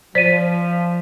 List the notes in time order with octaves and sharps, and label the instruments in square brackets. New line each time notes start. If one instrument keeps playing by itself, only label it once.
[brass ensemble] F3 [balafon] C5 D5 [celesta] B6 D#7